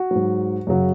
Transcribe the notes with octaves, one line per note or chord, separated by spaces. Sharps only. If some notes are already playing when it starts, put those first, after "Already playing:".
Already playing: F#4
G#2 F#3
F#2 C#3 F#3